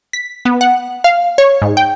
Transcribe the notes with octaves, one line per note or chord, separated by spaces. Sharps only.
B6
B3
F#5
F5
C#5
G#2
G5